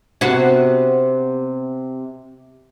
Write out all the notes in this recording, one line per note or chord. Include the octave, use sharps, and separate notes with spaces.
C3 B3 F#4